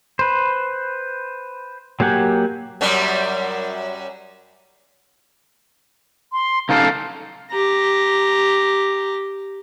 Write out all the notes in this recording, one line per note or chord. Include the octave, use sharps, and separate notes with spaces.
B4 C5
F#3 A#3 G4 F#5 G#5
F#2 F#3 G3
C6
C#3 D#4 A4 F5
G4 A#5